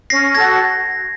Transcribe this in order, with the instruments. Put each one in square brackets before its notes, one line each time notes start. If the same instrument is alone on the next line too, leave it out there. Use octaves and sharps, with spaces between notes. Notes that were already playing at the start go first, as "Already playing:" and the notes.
[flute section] C#4 [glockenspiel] A#6 C7
[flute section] F#4 A4 [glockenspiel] G#6 A#6